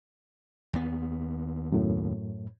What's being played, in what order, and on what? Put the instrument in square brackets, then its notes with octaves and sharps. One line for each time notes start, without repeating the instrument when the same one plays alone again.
[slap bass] D#2 B3
[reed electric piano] F#2 A2